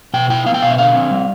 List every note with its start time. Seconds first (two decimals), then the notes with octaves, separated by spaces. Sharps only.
0.14 B2 G5
0.30 E4 G5
0.46 B3 F5
0.54 G5
0.62 B2 F5
0.71 E5
0.78 D3 F5
0.94 C4
1.11 G3